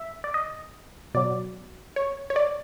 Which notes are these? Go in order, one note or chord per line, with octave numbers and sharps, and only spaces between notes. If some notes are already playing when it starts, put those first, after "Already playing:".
Already playing: E5
D5
D#5
B2 F#3 D5
C#5
C#5
D5